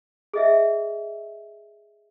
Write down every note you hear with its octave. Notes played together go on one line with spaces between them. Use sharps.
G#4 D#5 E5